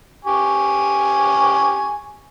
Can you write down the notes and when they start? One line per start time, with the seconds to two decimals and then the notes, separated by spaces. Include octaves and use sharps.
0.25 G4 G#5 C#6